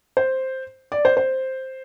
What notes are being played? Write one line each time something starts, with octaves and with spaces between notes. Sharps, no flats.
C5
D5
C5
C5